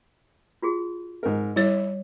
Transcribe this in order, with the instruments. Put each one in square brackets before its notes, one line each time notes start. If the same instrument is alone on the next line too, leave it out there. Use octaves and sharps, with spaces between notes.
[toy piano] F4 F#4 G#4
[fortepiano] G#2 A#4
[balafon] G3 C#5 [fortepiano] E4